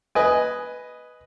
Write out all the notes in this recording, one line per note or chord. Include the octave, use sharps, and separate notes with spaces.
B4 D#5 G#5